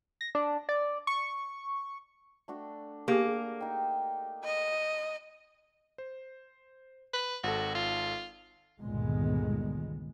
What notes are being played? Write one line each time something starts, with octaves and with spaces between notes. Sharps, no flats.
A#6
D4
D5
C#6
A3 D4 F#4
A#3 G4 G#4
D#4 G5
D#5
C5
B4
G#1 F#4 A4
F4
G1 C#2 A#2 D#3 G#3 B3